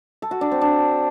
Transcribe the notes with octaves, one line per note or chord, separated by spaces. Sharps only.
A4
F#4
D4
C4
D4